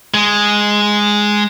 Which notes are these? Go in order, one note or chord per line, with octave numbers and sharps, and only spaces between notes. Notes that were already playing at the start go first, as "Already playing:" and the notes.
G#3